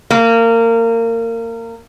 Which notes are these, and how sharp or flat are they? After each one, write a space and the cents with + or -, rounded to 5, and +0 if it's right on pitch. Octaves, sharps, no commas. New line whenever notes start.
A#3 -25